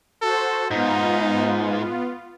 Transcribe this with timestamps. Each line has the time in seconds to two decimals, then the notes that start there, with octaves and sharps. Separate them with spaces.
0.22 F#4 A4 C5
0.71 G#2 B3 D#4 F4